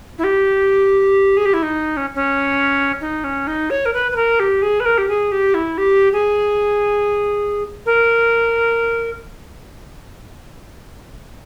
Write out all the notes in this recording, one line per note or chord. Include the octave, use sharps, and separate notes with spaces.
E4
G4
G#4
G4
E4
D#4
C#4
C#4
D#4
C#4
D#4
C#5
A#4
B4
B4
A#4
G4
G#4
B4
A#4
G4
G#4
G4
E4
G4
G#4
A#4